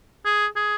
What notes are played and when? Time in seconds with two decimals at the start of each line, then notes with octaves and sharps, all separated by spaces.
0.25 G#4
0.56 G#4